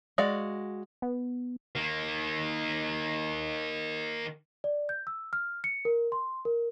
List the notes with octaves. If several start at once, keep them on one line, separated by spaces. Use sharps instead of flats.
G#3 F#4 D5 F5
B3
D#3 A#3
D5
G6
E6
F6
C#7
A#4
C6
A#4